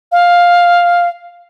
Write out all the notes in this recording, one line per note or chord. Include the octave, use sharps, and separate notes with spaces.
F5